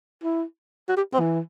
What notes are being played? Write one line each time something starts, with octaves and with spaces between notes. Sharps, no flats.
E4
F#4
G4
C4
E3